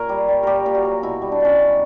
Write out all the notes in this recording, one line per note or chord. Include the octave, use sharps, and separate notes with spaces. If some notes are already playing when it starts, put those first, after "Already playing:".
Already playing: A#2 A#4 C#5
G3
G3
A#2 G4 A#4
A#2
F#4
F#3
B2 E4
G3
D4
B2 C#4
F#3